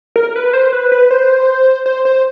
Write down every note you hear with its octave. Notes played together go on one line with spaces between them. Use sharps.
A#4
B4
C5
B4
B4
C5
C5
C5